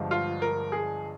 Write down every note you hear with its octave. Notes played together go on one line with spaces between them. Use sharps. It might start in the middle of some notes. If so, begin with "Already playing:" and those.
Already playing: G1 G2 F3 G#3
F4
A#4
G#4